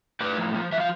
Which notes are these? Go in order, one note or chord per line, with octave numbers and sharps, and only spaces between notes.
A2 B4 D5
F3
F3
F3 E5
F5